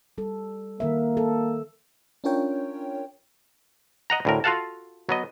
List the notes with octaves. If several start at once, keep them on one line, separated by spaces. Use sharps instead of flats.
G3 A4
D#3 A#3 A#4 E5
A4
C#4 D4 F4 A#4 C#5 G5
D#5 F#5 A#5
D2 A2 A#4
F4 F#4 A4 F5 F#5 A5
F#3 B3 D#5